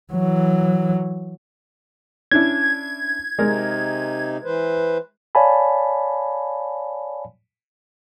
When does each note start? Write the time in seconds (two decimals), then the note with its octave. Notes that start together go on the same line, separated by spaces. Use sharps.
0.13 E3 F#3
2.31 C#4 D4 E4 G#6
3.39 C3 G#3 D#4 A#4
4.44 E3 B4 C5
5.35 C#5 D5 F5 G#5 A5 B5